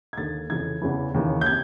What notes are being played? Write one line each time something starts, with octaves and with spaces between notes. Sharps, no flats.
G#6
D#2 D3 A6
F2 C#3 E3 G#6
E2 C#3 E3
D#2 C#3 E3
G6
C3 G#6